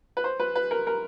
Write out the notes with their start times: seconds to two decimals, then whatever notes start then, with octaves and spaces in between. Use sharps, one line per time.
0.17 B4
0.24 C5
0.40 B4
0.56 B4
0.71 A#4
0.87 A#4